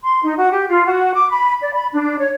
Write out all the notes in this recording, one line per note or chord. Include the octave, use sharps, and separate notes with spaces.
C6
D#4
F#4
G4
F4
F#4
D6
B5
D5
B5
D4
C#5